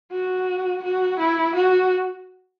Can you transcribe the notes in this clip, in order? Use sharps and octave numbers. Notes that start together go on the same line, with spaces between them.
F#4
F#4
E4
F#4